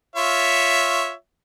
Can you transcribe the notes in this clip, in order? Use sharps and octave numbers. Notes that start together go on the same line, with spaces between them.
F4 C#5 E5